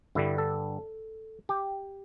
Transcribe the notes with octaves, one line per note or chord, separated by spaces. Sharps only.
G2 D3 G3 E4
A4
G4